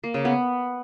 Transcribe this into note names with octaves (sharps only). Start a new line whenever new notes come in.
A#3
C#3
B3